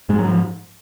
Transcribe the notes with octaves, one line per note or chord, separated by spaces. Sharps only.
G#2 G#3
F#3
F3